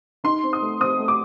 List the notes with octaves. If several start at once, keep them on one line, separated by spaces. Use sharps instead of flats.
D#4 C6
C4
D#6
A3
C4 D#6
A3
D6